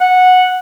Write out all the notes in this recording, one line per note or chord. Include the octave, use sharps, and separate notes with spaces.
F#5